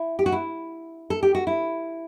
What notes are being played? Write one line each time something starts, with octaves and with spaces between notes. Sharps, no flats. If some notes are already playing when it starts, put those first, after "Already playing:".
Already playing: E4
G4
F#4
E4
A4
G4
F#4
E4